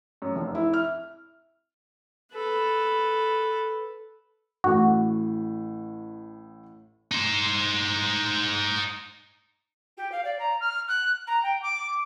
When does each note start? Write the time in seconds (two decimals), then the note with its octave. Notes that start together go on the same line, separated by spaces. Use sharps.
0.22 F#2
0.36 F1
0.55 E4
0.73 F6
2.34 A4 B4
4.64 A1 A2 F#4 A4
7.11 D#4 C5
9.97 G4
10.11 F5
10.24 D5
10.39 A#5
10.60 F6
10.87 F#6
11.26 A#5
11.43 G5
11.61 D6